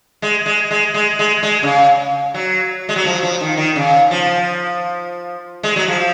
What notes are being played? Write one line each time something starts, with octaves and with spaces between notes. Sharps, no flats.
G#3
G#3
G#3
G#3
G#3
G#3
C#3
F#3
G#3
F#3
F3
F3
D#3
D#3
C#3
F3
G#3
F#3
F3